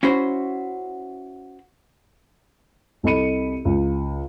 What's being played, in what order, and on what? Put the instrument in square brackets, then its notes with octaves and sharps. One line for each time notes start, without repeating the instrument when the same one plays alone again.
[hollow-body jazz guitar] C#4 E4 F#4 C5
[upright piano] C2 A4 D#5 B5 C#7 D#7
C#2